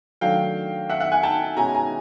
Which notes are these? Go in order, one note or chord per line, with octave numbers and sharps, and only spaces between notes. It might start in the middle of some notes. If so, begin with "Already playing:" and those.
D#3 F#3 A3 D4 F5 G5
E5 F#5
E5 F#5
F#5 G#5
G5 A5
B2 G#3 C#4 E4 G#5 A#5
G#5 A#5